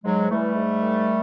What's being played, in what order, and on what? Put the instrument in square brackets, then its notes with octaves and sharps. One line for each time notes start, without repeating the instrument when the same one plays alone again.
[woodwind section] G#2 F#3 G#3
E3 G3 A3
G#2
D#3